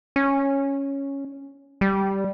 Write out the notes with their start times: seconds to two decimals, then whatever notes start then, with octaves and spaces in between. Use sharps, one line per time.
0.16 C#4
1.81 G3